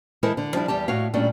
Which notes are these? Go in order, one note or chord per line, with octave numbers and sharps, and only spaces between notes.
E3 G#3 E4 A4 A#4 C5
D3
F3 G3 D4 E4
E2 G3 G4 A5
A2 F#4 C#5 F5
A#2 G3 A3 C#4 D4